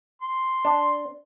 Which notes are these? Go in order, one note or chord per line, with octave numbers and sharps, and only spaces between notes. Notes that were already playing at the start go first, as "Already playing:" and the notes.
C6
D4